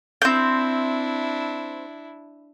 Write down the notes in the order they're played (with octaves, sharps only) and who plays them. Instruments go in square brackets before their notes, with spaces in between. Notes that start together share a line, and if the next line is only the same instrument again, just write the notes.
[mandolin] C4 G6 [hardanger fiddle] D4 E4